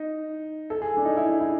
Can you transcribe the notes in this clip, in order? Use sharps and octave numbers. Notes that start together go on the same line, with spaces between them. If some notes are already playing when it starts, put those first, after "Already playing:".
Already playing: D#4
A4
G#4
D4
D#4
E4
E4